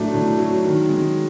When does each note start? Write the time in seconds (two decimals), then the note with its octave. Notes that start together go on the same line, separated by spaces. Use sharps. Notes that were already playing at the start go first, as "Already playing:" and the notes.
Already playing: A2 F#3 A3 D4
0.14 A2
0.39 F#3
0.64 D#3
0.89 G#3